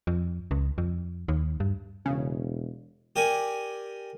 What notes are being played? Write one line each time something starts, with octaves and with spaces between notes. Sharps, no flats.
F2
C#2
F2
D#2
G2
E1 C#3
G4 A#4 D5 G#5